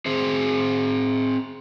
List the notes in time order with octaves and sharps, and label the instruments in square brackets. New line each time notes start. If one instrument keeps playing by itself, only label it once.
[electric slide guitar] C4 G#4 C5